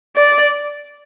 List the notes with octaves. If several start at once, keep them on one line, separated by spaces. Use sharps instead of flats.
D5